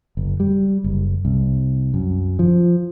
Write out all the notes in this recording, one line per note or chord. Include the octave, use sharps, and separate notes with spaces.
F#1
G3
F#1
C2
F#2
F3